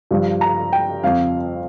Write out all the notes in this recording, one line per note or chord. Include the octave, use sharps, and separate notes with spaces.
G2 F3
A#5
G5
F2 F3 F5